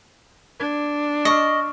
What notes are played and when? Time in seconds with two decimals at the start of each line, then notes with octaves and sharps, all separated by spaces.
0.60 D4 G#6
1.25 D#5 C#6 F6